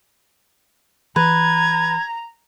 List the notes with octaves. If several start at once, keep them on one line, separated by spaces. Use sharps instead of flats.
E3 B4 A#5 G#6